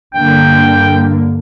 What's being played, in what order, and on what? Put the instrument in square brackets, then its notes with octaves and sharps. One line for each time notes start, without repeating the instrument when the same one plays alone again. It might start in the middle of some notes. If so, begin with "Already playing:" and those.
[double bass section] G2 D3 A#3 [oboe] G5